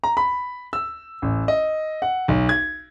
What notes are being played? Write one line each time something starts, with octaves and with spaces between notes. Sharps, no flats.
A#5
B5
E6
A1
D#5
F#5
B1
G#6